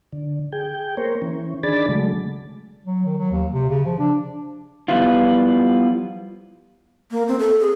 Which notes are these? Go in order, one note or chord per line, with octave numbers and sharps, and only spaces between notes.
D3
G#4 G5
A#3 A#4 C5 C#5
E3 C#4
D#3 D4 G#4 D5 B5 A6
C#3 F#3 G#3 A3
F#3
D#3
F#3
D#2
C3
C#3
F3
D4
F3 G3 B3 E4 F4
A#3
C4
A4
G#4